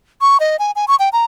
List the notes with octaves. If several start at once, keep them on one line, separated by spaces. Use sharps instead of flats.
C#6
D#5
G#5
G#5
C#6
G5
A#5